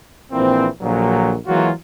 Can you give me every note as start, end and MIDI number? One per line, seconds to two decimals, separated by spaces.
0.32 0.67 34
0.32 0.67 46
0.32 0.67 52
0.32 0.67 60
0.82 1.34 34
0.82 1.34 46
0.82 1.34 50
0.82 1.34 53
0.82 1.34 54
1.48 1.70 52
1.48 1.70 54
1.48 1.70 56
1.48 1.70 58
1.48 1.70 65
1.48 1.70 66